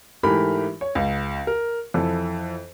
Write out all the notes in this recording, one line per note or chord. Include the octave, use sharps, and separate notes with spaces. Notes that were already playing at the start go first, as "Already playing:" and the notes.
G#2 E3 A3 G4 A#4 B5
C#5
C#2
A#4
F2 E3 A4